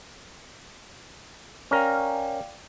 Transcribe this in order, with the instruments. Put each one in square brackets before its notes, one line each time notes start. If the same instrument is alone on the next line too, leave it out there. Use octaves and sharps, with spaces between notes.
[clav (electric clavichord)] C#4 A#4 [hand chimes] D5 F5 G5